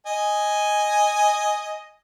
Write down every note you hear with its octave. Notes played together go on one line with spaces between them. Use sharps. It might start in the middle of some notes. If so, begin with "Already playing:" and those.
D#5 G#5